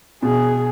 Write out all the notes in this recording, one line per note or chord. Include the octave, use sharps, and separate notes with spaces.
B2 G#4